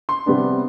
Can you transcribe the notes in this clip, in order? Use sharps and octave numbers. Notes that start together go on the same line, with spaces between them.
C6
C3 G3 B3 D4